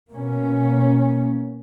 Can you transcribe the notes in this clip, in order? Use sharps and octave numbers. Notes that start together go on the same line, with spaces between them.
B2 A#3 C#4